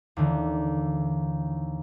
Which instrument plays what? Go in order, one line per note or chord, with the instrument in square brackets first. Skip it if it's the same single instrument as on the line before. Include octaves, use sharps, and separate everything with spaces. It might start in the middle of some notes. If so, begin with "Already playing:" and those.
[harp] D#2 D3 E3